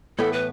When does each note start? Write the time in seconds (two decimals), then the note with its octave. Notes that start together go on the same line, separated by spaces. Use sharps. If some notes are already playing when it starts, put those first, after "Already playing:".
0.18 A2 E3 B3 A4
0.33 B4